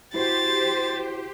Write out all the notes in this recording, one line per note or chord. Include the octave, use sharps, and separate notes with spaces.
E4 F#4 G4 C5 A6